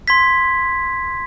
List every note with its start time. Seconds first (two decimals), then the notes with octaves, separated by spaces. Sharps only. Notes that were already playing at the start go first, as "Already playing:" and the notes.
0.08 C6 G#6 B6